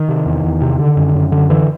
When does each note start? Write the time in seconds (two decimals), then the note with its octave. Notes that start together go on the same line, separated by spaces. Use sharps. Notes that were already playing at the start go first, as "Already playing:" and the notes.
Already playing: D#3
0.09 C3
0.26 E2
0.44 E2
0.62 C3
0.79 D3
0.97 F#2
1.15 F#2
1.32 D3
1.50 D3 E3